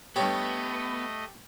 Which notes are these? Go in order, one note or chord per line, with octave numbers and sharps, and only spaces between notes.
G2 A3 B3 G4 A4 C#5 D#5